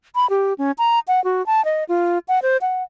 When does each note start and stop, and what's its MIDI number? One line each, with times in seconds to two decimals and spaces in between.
0.15 0.29 83
0.30 0.54 67
0.58 0.72 61
0.78 0.99 82
1.08 1.23 78
1.24 1.45 66
1.46 1.64 81
1.65 1.84 75
1.89 2.19 65
2.28 2.39 78
2.42 2.57 72
2.61 2.83 78